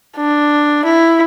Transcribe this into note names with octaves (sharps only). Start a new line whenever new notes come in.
D4
E4